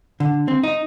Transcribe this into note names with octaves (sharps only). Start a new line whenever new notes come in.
D3
C4
D#4